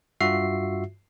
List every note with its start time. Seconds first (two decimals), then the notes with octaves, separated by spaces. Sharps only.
0.21 G2 F4 F#4 E5 C7